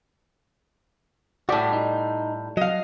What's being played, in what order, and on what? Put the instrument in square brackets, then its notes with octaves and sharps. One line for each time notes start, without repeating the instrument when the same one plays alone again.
[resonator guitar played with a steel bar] A2 G3 [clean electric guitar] F#4 D5
[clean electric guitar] D#4
[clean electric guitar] F#3 [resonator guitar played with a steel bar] D#5 F5